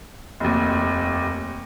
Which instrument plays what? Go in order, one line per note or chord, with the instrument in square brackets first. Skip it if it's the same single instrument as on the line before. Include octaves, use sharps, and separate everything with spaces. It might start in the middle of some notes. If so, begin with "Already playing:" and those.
[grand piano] F1 D#2